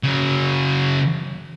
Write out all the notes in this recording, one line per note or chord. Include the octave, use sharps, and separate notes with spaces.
C#3 F#3